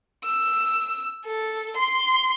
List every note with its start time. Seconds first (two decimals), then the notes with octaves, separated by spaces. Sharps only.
0.25 E6
1.25 A4
1.76 C6